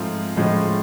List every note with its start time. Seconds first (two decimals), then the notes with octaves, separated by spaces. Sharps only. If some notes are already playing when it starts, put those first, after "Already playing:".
Already playing: G#2 F3 A3 C4 F4
0.36 A2 F3 G#3 C#4